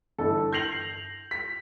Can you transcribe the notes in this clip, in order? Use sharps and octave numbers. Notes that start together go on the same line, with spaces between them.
G1 E3 A4
G6 A#6 C7 F7 F#7
B6